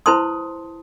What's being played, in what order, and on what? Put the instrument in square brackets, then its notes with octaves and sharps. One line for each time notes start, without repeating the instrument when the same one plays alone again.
[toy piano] E4 B4 C5 A5 C6 D#6